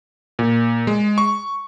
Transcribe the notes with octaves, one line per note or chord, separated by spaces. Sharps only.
A#2
G#3
C#6